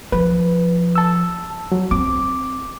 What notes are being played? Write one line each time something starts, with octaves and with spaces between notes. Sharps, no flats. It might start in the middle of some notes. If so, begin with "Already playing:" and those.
F3 B4
A5 E6
F#3
C4 D6